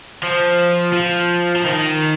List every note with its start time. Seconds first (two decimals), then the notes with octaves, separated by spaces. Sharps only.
0.23 F3
0.93 F3
1.56 F3
1.65 D#3